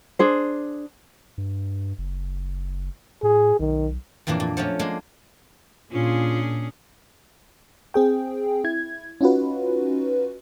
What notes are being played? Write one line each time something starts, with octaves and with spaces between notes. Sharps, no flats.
D4 G#4 C5
G2
F#1
A2 G#4
B1 D#3
F2 A#2 E3 A#3 D4
A#2
F3 F#3 A3 C#4
G#3 A#3 D4
A#2 C#4 D4 F4 G#4
C4 G#4 G5
E4 G#6
C#4 D#4 F4 F#4 B4